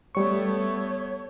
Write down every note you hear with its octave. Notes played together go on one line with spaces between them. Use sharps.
G3 A3 B3 C#5 C#6